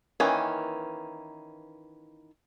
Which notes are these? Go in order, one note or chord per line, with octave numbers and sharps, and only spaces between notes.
D#3 E3 A#3 C#4